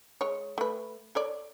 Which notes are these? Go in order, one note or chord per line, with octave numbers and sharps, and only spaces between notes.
G#3 C#5
A3 B4
A4 C#5 D5